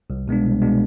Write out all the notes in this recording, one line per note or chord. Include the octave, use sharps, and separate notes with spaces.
C2
B2 G#3 B3 D4
C2
B2 G#3 B3 D4